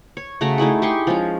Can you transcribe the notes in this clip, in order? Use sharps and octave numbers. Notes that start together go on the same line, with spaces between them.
C#5
C#3 A3 F#4 A#5
A3 D#4 E4 G#4
G4 G#4 C6 C#6
F3 G#3 C#4